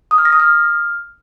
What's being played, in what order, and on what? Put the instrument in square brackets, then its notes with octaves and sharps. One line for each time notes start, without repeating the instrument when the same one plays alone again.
[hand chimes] D#6
F6
A#6
D#6
F6